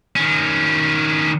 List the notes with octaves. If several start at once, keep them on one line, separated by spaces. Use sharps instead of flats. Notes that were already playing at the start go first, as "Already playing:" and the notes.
D#3 C#4